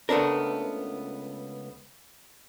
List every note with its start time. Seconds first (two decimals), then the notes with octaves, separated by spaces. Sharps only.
0.09 C#2 A3 B3 D4 A#4